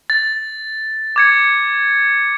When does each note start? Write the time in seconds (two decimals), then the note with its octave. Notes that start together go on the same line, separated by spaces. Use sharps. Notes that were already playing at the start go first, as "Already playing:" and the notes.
0.10 A6
1.16 D6 G#6 C#7